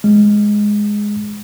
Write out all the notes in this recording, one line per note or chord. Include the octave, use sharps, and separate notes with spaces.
G#3